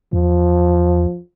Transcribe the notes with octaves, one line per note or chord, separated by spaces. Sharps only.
E2 F3